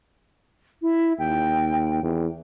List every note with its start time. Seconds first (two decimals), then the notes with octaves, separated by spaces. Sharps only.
0.82 E4
1.19 D#2 G5
2.03 E2